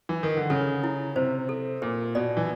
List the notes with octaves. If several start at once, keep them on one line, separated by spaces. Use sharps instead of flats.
E3
D#3
D3
C#3 A4
E4
C3 C5
A4
A#2 A#4
B2 D5
E3